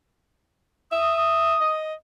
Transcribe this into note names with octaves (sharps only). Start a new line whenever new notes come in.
E5 D#6
D#5